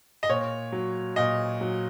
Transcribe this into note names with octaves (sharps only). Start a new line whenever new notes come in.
D#5
A#2 C#5
F#3
A#2 D#5
F#3